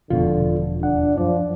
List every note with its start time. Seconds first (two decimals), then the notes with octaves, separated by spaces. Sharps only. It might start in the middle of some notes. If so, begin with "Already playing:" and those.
0.10 E1 F2 B2 D3 F4
0.82 D#2 D4 F#5
1.18 F#2 F3 D5